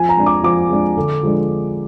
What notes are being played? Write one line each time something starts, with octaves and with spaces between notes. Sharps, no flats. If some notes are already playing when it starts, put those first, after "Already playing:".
Already playing: F3 G#5
A#5
G#3 D4
D6
F3 D6
G#3 D4
D3
F3 G#3 D4